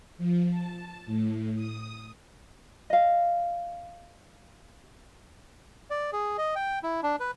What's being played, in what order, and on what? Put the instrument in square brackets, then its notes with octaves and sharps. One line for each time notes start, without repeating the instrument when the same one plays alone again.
[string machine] F3
A5
A2
D#6
[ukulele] D#5 F5
[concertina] D5
G#4
D#5
G5
E4
D4
B4